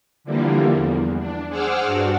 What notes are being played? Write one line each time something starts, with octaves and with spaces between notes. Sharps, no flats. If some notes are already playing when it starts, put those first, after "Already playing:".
D3 E3 F3 G3 A#3
E2
D4
G#4 C5 F#5 D6 E6 F6
G2 D4 F#4